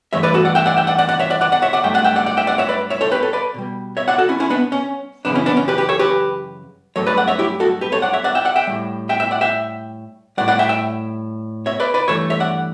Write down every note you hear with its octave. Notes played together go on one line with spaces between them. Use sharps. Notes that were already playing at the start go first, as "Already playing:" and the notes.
G2 E3 A3 C#5 E5
B4 D5
F#4 A4
D5 F#5
E5 G5
D5 F#5
E5 G5
D5 F#5
D5 F#5
D5 F#5
C#5 E5
D5 F#5
D5 F#5
D5 F#5
C#5 E5
D5 F#5
G2 F#3 A3 E5 G5
D5 F#5
E5 G5
D5 F#5
D5 F#5
E5 G5
D5 F#5
C#5 E5
B4 D5
C#5 E5
A4 C#5
G4 B4
A4 C#5
B4 D5
B2 G3
C#5 E5
D5 F#5
F#4 A4
C#4 E4
C#4 E4
B3 D4
C#4
F#2 C#3 E3 B3 D4
C#4 E4
B3 D4
C#4
G4 B4
G4 B4
A4 C#5
G4 B4
G2 F#3 A3 A4 C#5
B4 D5
D5 F#5
C#5 E5
E4 G4
F#4 A4
G4 B4
A4 C#5
D5 F#5
C#5 E5
D5 F#5
E5 G5
D5 F#5
E5 G5
A2 G3
E5 G5
E5 G5
D5 F#5
E5 G5
A2 G3 D5 F#5
D5 F#5
E5 G5
E5 G5
C#5 E5
B4 D5
B4 D5
G2 E3 A3 A4 C#5
C#5 E5
D5 F#5